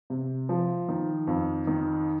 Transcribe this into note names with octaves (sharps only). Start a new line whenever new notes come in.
C3
F3
D#3
F2
D#3